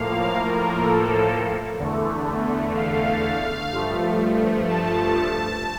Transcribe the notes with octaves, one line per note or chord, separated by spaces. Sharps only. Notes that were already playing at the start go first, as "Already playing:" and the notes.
Already playing: A2 F3 A#3 F5
A#4
A4
E2 D3 A3
F5
G2 F3 A3
A5